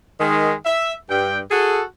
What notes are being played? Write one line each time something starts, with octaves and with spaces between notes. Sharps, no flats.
D#3 G#3
E5
G2 G5
F#4 G#4 A4